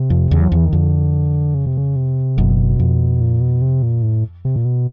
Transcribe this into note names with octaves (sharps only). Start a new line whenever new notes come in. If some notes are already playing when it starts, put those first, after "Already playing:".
Already playing: C3
F2
E2 C#3
F#3
E2 F3
E3
D#3
F2 D3
C#3
C3
C#3
C3
F#1 F#2 B2
F2
A#2
B2
C3
A#2
A2
C3
A#2
B2